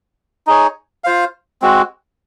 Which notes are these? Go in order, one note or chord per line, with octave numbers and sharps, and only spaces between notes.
D#4 G#4 C#5
F4 C5 F5
G#3 C4 F#4